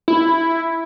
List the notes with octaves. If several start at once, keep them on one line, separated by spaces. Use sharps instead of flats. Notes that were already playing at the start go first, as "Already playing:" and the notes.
E4